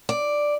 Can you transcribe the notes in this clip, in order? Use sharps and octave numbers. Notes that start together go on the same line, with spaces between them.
D5